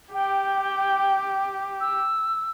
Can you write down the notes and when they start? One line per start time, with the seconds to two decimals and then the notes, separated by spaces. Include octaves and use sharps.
0.14 G4 G5
1.81 E6